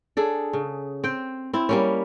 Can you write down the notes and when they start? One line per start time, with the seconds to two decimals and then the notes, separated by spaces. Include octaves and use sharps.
0.17 D4 G#4 A4
0.53 C#3
1.04 C4 G5
1.53 C4 E4
1.69 G3 A#3 C#4